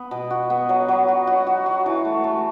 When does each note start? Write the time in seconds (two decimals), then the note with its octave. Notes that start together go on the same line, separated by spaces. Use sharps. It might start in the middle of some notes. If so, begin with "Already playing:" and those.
Already playing: B3
0.11 B2
0.30 F#4
0.50 B3
0.69 F#3
0.88 F#3
1.08 F#4
1.27 F#4
1.47 F#4
1.66 F#4
1.86 E3
2.05 A3
2.24 A3